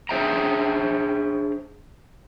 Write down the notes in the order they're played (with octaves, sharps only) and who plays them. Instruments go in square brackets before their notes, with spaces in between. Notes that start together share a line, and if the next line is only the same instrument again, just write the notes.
[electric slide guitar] D4 G#4 C5 E5 G5 A#5